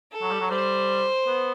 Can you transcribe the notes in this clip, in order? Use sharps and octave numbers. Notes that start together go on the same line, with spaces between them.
A4
F#3
G3
F#3
G3 C5
B3